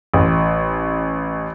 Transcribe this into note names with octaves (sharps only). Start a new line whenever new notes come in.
A1